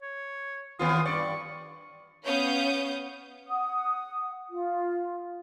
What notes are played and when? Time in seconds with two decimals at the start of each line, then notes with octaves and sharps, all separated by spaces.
0.02 C#5
0.79 D#2 B3 F4 D#6
1.05 G2 D5 C#6
2.26 B3 C#4 C#5 F5 D#6 G6
3.47 F#5 D#6
4.50 F4